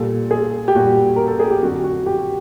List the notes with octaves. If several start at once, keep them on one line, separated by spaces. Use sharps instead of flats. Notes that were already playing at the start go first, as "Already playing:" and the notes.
Already playing: A#2 G3 A4
G#4
G4
A#2 G3 F#4
A#4
A4
G#4
G4
F2 D3 F#3 F#4
F#4
G4